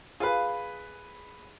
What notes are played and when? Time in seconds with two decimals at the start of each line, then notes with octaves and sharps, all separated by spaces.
0.20 F4 G#4 B4 F5